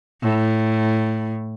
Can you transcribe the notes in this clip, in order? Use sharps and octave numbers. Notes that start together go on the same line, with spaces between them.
A2